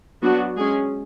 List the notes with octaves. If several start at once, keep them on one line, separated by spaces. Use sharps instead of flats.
F#3 B3 D4 F#4
G#3 C#4 G#4